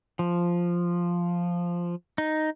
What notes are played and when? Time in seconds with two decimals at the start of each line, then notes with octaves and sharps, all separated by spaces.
0.19 F3
2.18 D#4